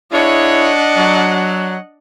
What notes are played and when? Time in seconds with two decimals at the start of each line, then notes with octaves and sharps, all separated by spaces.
0.12 D4 E4 G#4 C#5 D#5 F#5
0.97 F#3